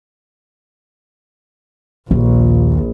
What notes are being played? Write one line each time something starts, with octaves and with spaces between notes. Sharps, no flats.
A#1 D#2